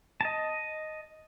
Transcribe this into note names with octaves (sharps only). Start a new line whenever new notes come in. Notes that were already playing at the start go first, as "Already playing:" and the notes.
D#5 A5